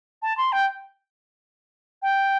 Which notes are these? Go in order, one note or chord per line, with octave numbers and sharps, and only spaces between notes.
A5
C6
G5
G5